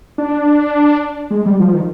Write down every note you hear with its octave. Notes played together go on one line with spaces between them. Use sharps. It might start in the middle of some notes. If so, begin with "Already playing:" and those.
D4
G#3
G3
F3
D#3